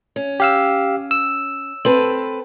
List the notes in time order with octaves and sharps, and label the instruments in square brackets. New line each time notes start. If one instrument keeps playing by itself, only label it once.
[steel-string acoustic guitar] C#4
[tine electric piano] G4 F5 E6
E6
[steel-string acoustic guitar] C4 A4 B4